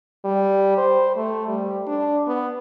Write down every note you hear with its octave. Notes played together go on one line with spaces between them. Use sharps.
G3
C5
A3
G3
D4
B3